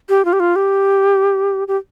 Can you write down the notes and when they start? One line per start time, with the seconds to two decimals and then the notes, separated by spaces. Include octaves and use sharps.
0.09 G4
0.25 F4
0.33 G4
0.40 F4
0.56 G4
1.68 G4